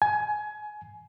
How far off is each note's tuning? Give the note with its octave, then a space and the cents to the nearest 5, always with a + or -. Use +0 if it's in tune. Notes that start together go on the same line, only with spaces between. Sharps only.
G#5 +25